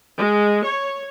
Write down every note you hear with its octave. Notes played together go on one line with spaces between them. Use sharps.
G#3
C#5